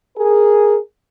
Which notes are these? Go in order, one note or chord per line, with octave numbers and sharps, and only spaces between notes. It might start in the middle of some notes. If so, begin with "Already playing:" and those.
G#4 A#4